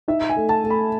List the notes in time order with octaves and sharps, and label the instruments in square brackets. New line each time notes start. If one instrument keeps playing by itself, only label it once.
[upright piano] D#4 [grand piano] E5
[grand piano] G#5
[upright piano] A3
[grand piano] A5
[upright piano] A3
[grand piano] B5